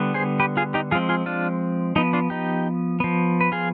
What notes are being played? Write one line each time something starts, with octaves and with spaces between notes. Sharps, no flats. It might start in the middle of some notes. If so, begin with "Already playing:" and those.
Already playing: D3 G3 B3
G#4 C5
G4 B4
F4 G#4
D#4 G4
F3 G#3 C4 F4 G#4
F4 G#4
D4 F4
F3 B3 D#4
D4 F4
D#4 G4
F3 B3
B4
F4 G#4